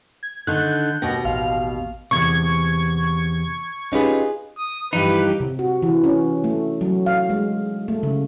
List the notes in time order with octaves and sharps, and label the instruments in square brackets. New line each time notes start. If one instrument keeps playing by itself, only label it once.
[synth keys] G#6
[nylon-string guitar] D3 D#3 [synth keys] F#6 G6
[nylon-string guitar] D#2 B2 G5 [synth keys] A#6
[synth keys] A1 F5
[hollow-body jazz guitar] E2 G2 C3 [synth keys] C#6 G#6
[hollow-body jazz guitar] C#4 G4 B4 [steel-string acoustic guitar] D#4 F4 G#4
[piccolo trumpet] D#6
[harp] G2 E3 F3 [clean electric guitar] D#4 [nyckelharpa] G4 [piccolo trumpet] B4
[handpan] C3
F#4
E3
C#4
A3
F#3
F5
G#3
A3
C#3